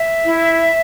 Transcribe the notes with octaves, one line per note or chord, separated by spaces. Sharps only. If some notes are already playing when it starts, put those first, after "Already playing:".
Already playing: E5
E4